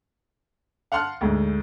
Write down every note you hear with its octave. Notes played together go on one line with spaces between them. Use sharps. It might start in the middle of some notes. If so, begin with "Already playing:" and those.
F5 F#5 A5 C6 F6 F#6
D2 G#2